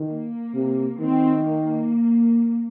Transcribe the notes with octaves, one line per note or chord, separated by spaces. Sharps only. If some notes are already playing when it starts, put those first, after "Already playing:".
Already playing: D#3
A#3
C3
D#3 C4
A#3